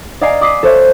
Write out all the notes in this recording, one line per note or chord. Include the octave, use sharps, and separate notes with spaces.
D5 D#5 F5 G#5 A#5 C7
D6 D#6 B6 C7 D7 D#7
A4 C5 C#5 E5